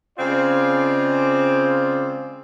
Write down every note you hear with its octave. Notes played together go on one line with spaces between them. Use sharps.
C#3 G#3 C4 F4 D5